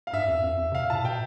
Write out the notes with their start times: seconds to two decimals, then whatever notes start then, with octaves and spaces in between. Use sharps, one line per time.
0.07 F5
0.13 G2 E5
0.28 F2
0.43 F2
0.59 F2
0.72 C3 F5
0.80 B2
0.90 A2 A5
1.04 B2 G5